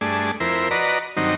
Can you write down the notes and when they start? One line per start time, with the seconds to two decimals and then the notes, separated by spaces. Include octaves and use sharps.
0.01 G2 A3 D4 G#4
0.40 F2 E4 A#4 C5
0.71 F#4 B4 D5 D#5 A#5
1.17 G2 D#3 F#3 C4 D#4